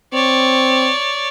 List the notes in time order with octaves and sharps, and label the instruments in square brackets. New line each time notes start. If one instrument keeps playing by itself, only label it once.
[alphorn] C4 [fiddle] C#5 D5